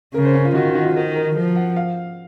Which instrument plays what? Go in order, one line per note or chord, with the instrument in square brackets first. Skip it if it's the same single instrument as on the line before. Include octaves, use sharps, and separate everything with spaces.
[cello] C#3 [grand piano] A#4
[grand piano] C5
C#4
F4
[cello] D#3 [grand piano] F#4
[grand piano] F4
F#4
F4
[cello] D#3 [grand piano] A#4
[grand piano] A#4
[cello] F3 [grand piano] A#4
[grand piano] F#5
F5